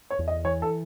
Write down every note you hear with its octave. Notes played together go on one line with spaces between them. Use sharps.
C#5
E2
D#5
E3 C#5
A4